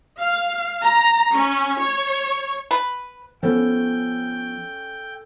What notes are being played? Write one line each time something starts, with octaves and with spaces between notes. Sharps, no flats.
F5
A#5
C#4
C#5
B4
F3 B3 C#4 A4 G5